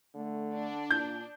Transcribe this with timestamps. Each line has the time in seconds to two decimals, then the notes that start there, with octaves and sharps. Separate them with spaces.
0.15 D3 A3
0.53 D4
0.91 A#2 G6